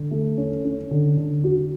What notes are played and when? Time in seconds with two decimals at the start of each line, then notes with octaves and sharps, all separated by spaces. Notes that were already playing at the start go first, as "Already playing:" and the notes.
Already playing: D3
0.11 A3
0.37 C#4
0.65 C#4
0.91 D3
1.17 D3
1.44 F#4